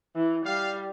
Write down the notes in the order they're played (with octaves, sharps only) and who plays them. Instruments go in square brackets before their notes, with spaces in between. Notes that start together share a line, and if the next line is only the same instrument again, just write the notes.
[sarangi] E3
[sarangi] G3 [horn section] F5